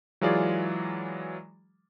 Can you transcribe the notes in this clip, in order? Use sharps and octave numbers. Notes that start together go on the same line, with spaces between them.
E3 F#3 G#3 F4 G#4 D5